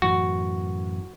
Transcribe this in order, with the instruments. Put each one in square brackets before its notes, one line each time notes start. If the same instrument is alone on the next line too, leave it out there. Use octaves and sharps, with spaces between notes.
[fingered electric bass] F#2 A2 E3 [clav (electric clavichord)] F#4